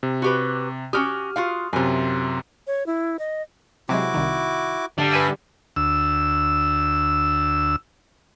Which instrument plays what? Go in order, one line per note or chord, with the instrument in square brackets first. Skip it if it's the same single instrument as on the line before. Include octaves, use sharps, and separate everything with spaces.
[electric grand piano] C3
[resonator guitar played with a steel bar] F#4 G4 B4
[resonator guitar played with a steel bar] C#4 F#4 G4 [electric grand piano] D#6 F6
[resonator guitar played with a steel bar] F4 F#4 F5
[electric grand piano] F#2 C3 [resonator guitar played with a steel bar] F4 G#5
[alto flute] C#5
E4
D#5
[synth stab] C3 F#3 G#3 [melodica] E4 F#4 D6
[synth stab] C2 D#3
[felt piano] D3 G4 [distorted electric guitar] G3 D4
[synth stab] B4 G#5 E6 [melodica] D5 E5
[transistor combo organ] D2 E6